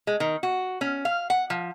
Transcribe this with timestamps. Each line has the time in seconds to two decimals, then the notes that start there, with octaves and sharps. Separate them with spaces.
0.07 G#3
0.20 D#3
0.43 F#4
0.81 C#4
1.05 F5
1.30 F#5
1.50 F3